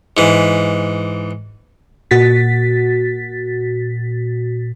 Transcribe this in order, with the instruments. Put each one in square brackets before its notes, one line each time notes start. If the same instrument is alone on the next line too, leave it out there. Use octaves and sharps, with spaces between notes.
[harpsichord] G#2 E3
[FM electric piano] A#2 F#4 A6 B6